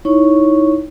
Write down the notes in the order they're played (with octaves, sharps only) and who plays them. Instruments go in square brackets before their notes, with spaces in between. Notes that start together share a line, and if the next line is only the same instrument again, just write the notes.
[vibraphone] D#4 E4 C#5 C#6